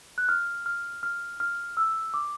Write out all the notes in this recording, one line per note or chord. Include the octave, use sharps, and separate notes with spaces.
F#6
F6
F6
F6
F6
E6
D6